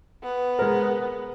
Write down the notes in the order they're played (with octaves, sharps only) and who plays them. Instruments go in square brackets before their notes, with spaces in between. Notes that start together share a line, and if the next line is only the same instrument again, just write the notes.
[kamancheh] B3
[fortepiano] G#3 A#4